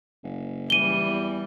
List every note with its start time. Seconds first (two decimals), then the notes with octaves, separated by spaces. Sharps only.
0.23 F#1
0.70 E3 G3 D#7 G7
1.07 E2